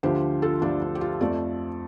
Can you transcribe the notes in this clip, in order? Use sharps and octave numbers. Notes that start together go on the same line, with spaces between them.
D2 D3 F3 G4 C5
F4 A4
D2 D3 F3 D4 G4
D4
G4
F4
F2 F3 A3 A4 D5